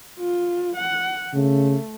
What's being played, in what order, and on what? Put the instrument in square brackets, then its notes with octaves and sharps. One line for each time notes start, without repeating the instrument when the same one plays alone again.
[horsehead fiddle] F4
F#5
[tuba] C#3 [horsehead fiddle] A3